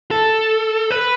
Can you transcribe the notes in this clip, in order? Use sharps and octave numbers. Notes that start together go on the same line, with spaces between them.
A4
B4